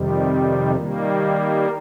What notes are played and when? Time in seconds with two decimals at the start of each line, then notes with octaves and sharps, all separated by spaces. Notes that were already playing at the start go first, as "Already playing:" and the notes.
Already playing: F2 C3 D#3 G3
0.75 D#3 G3 A#3